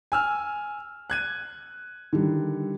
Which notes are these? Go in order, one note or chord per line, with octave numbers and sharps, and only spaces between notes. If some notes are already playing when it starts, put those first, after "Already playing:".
G#5 E6 F6
F#6 G#6 D#7
D3 D#3 G3